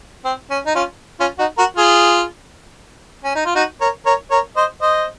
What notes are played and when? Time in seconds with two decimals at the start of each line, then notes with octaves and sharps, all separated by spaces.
0.25 C4
0.50 C#4
0.66 D#4
0.75 C#4 F4
1.20 C#4 F4
1.39 D#4 F#4
1.58 F#4 A#4
1.77 F4 G#4
3.24 C#4
3.35 D#4
3.45 F4
3.55 D#4 F#4
3.81 A#4 C#5
4.06 A#4 C#5
4.31 A#4 C#5
4.56 C5 D#5
4.82 C5 D#5